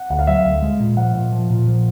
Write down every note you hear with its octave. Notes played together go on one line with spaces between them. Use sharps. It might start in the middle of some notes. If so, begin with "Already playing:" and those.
Already playing: F#5
D2 F#5
F5
F#3 E5
F5
D2
G#3
A#2
F3 F#5
A#2
F3
A#2
F3